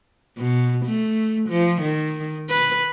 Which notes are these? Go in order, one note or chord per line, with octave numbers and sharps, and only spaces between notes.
B2
A3
F3
D#3
B4